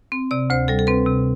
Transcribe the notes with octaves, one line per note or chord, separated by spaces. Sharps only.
C4
C3 D5
D2 C5
G3 A4
A4
C4 B4
C3